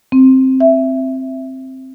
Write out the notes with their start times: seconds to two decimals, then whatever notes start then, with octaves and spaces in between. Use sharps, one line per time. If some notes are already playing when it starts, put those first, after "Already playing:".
0.12 C4
0.60 E5